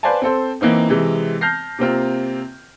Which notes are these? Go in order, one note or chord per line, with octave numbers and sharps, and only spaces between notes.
B4 C5 D5 F5 G#5 A5
C4 A4 C5
E3 A#3 C4 D#4
C3 E3 G#3
A5 F6 G6 A#6 C7
C3 A#3 C4 F4